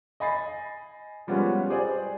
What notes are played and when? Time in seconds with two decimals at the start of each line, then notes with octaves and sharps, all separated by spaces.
0.20 D#5 G#5 B5 A6 C7
1.27 F3 G3 G#3 B3 C#4 F4
1.70 G4 G#4 C5 D5